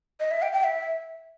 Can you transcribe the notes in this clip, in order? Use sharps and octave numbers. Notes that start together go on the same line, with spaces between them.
D#5
E5
G5
G5
E5